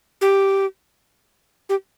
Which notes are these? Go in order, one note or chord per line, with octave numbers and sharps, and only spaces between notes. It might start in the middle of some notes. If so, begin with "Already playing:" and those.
G4
G4